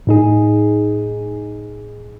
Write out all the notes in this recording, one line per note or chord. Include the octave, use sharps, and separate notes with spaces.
A2 D#4 G#4